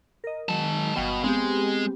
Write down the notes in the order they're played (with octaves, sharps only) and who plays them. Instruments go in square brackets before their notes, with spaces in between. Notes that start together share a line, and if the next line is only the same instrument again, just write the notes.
[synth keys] A#4 D#5
[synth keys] D#3 F#3 [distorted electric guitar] G#3 A5
[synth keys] G1 F5 G5 [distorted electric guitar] B2
[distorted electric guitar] G#3 [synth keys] B3 C4 G4